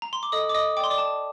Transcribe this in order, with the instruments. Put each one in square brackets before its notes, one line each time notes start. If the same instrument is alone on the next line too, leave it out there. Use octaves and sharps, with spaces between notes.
[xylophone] A#5
C6
D6
A4 D#5 D#6
D6
D#5 D#6
D5 G5 D6
C6
D5 D6
A5